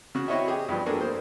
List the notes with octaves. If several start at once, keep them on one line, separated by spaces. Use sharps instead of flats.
C#3 F#4
C4 E4 F#4 C#5 D#5 E5
G4 G#4
G2 F3 G3 B3
A3 A#3 D4 F#4 G#4 A4
A#3 C5